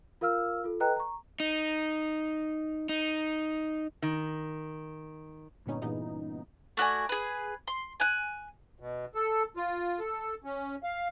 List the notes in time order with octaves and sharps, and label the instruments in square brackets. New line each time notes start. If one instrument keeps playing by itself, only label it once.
[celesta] F4 A#4 F5 E6 F6
F4 A4
A4 B4 D#5 G5 A#5 F#6
A#5 C#6
[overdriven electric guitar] D#4
D#4
[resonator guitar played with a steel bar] D#3
[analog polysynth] G2 A#2 D3 B3 C#4 D#4
G2 A#2 C#3 E3 B3 D#4
[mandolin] A3 F#4 D5 G#5
G#4 B4
C6
G#5 F#6
[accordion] B2
A4
F4
A4
C#4
F5